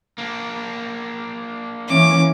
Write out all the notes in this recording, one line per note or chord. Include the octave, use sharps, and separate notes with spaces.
A#3 D4
E3 C#4 D6